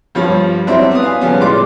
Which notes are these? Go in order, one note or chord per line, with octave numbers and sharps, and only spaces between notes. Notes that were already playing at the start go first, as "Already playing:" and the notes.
G2 F3 G3 C#5
F#3 G3 C4 D4 E4 E5
B3 D#6
F5 G#5
C#3 F3 G3 B3 C#4
A2 G#3 G4 D5 C6 D6